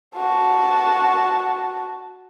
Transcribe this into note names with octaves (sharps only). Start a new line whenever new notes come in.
F#4 A5